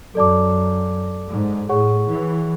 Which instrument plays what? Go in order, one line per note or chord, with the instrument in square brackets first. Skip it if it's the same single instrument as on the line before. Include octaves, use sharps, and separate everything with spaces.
[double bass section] F#2 [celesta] A4 D5 A5 D6
[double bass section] G#2
[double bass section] A2 [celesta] G#4 C#5 F#5 C#6
[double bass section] E3